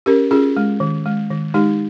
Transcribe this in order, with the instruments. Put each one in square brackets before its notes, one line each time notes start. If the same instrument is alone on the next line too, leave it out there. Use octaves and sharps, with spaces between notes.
[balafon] C#4 G4 A#4
C#4 F4 G#4
G#3
D#3
G#3
D#3
G#3 D#4 G4